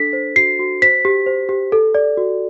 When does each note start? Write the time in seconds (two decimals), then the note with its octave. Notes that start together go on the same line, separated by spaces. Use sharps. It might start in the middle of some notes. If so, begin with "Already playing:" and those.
Already playing: D4 A4 B6
0.13 C5
0.36 F#4 C7
0.59 F#4
0.82 C5 B6
1.05 G4
1.26 C5
1.49 G4
1.72 A4
1.95 D5
2.17 F#4